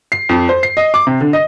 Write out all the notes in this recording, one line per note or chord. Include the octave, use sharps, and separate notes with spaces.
C7
F2
C5
C7
D#5
D6
C3
D3
D#5